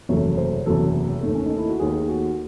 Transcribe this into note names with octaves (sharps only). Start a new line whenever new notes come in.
F#1 E2 C3 F#3 A3 C#5
C5
F#1 E2 C3 F#3 A3 A4
D#2 D#3 A3
C#4
D#4
E4
F#4
D#2 D#3 A3 G#4
F#4